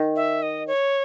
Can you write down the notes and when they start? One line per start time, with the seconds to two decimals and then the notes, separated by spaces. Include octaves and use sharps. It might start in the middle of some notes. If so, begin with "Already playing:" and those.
Already playing: D#3
0.16 E5
0.43 D#5
0.67 C#5